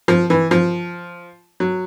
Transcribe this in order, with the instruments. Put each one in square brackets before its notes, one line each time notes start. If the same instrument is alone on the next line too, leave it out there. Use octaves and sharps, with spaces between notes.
[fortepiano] F3
E3
F3
F#3